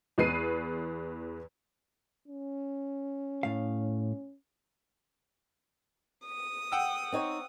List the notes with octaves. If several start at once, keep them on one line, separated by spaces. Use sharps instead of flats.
E2 B4 C7 D#7
C#4
A2 F5
D#6
F#5 G5 E6
C4 D#4 C#5